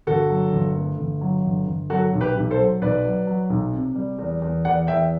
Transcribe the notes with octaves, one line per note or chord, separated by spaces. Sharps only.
G1 F#4 A4
F#3
G1
A3
G1
F#3
G1
G1
F#3 F#4 A4
B1
G4 B4
B1
A4 C5
F#3
B1 B4 D5
F#3
F#3
B1
C3
G3
E2
E2
E2 D5 F#5
E2 E5 G5